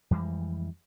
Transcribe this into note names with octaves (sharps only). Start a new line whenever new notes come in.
F2 E3 G3 G#3